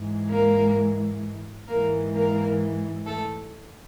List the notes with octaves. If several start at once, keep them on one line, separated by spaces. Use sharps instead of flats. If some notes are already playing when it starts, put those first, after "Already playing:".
Already playing: G#2 E3 G#3
A#3 A#4
G#2 E3 G#3 A#3 A#4
A#3 A#4
A3 A4